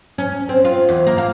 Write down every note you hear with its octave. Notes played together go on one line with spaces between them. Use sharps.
C#4
C4
F4
E2
A#3
F5